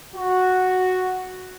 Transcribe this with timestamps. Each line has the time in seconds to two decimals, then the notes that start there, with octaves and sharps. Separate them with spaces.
0.14 F#4